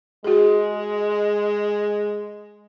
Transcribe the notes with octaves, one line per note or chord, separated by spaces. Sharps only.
G#3 F#4 G#4